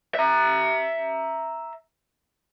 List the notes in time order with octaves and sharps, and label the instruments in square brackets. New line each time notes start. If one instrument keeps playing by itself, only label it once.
[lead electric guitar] E5 A#5